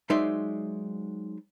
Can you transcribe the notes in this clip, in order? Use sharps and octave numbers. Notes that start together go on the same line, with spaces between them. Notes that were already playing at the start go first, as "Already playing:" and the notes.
F#3 G#3 D#4 C5 D5 E5